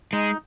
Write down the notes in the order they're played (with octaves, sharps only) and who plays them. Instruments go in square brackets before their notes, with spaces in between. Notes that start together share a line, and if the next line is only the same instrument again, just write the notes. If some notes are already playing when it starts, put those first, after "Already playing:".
[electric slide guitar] G#3 [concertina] D#4